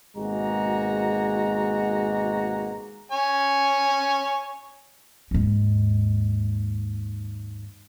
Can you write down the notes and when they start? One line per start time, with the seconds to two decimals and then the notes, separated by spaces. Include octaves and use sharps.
0.17 G#1 B2 G#3 A#3 F#4 A#5
3.12 C#5 G#5
5.31 D#2 G#2